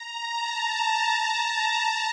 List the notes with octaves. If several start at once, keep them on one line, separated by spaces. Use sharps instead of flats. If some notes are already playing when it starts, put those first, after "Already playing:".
Already playing: A#5
A5